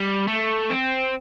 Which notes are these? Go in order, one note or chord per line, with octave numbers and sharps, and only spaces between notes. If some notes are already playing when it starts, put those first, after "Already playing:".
Already playing: G3
A3
C4